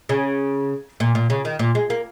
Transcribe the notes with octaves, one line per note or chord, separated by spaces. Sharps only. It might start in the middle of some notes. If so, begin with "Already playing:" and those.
C#3
A#2
A#2
C#3
D#3
A#2
G#3
A#3